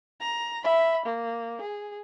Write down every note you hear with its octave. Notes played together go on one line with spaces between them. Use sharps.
A#5
E5 B5
A#3
G#4